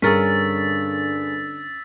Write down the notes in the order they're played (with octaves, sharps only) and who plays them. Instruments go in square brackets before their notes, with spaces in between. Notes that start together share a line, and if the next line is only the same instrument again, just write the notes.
[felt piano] G2 G#4 [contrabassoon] D3 [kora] C#4 A#4 [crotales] E6 A6 B6